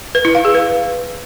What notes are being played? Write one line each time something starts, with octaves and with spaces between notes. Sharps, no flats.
B4
E4
F5
G#4
B4